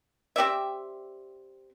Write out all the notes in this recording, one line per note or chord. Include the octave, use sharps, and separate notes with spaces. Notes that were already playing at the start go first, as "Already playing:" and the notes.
C4 G4 D5 E5